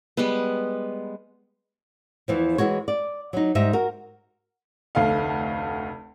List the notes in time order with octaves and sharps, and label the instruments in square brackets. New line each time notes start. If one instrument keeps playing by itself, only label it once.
[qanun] G3 G#3 B3
[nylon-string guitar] E2 E3 F3
E3 G#3 F#4 C#5
D5
F#3 D#4
G#2 G3 D#4 D#5 E5
F#4 A#4
[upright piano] F1 D2 A3 F5